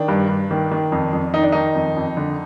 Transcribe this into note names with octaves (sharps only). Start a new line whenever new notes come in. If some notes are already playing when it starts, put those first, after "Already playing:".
Already playing: D#3 D4
G2
G2
D#3
D#3
F2
F2
D#3 D#4
D4
D#3 D#4
F2
F2
D3